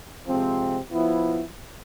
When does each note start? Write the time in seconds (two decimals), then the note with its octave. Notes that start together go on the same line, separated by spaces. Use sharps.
0.27 C3 F3 G#3 C4
0.92 F3 B3 E4